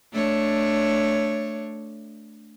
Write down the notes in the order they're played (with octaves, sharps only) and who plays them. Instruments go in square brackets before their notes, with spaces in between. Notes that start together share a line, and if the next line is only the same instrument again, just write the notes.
[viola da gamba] A3 D4 C#5